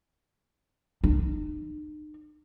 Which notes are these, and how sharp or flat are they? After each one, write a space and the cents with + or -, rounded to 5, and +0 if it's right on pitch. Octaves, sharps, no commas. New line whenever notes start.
D#4 -45